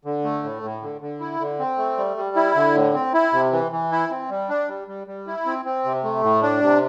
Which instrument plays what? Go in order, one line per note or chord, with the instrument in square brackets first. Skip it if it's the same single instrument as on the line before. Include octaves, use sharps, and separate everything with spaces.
[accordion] D3
A3
A2
A2
D3
D3
E4
D3
C4
A3
G3
G3
E4
D3
A2
C4
E4
C3
E3
E3
E4
C4
G3
D4
G3
G3
G3
E4
C4
C4
C3
A3
A2
D4
C3